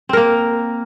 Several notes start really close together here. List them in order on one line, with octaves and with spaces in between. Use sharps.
C4 A#4 A#3